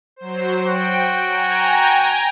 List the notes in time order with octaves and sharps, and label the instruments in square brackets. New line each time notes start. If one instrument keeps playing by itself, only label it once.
[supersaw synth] F#3 C5
[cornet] F#4 [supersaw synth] G5 D7
[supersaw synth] G5 G#5 A#5